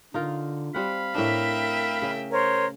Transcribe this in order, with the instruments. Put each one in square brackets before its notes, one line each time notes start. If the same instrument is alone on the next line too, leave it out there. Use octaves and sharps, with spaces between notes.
[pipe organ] D3 [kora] D#4 F4 A#4
[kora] G3 C4 F#5 [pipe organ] F5 B5
[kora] A2 D4 [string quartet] A#4 E5 G5
[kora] C#3
[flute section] A#4 C5 C#5